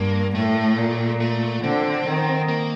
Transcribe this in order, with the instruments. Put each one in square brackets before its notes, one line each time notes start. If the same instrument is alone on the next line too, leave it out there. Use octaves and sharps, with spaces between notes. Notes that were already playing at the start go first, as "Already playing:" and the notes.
Already playing: [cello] G2 [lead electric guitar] A#3
[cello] A2 [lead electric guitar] A3
[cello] A#2
[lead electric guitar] A3
[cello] D3 [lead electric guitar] C4
[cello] D#3
[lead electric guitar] A#3